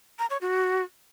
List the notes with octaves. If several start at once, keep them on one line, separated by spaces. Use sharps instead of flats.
A#5
C#5
F#4